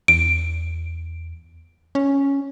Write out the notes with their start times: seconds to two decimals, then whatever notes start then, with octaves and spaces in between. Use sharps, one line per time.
0.08 E2 D7
1.95 C#4